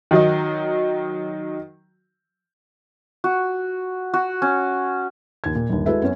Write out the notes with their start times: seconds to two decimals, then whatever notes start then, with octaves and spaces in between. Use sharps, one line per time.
0.11 D#3 F#3 D#4
3.24 F#4
4.14 F#4
4.42 C#4
5.44 D#2 G#6
5.55 A#2
5.69 G1 D#2
5.86 G#3 E4 F#4 A4 B4 E5
6.02 F#2 B3 C#4